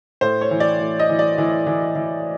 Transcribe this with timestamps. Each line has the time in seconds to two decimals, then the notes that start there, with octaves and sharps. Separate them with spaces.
0.21 A2 C5
0.41 C#5
0.51 E3
0.60 D5
0.80 A2
1.00 D#5
1.09 E3
1.19 D5
1.38 E3
1.67 E3
1.96 E3